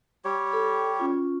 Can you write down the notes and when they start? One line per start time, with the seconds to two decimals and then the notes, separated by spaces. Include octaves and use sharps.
0.25 G3 G4 C#5
0.53 A4
1.00 C#4 F4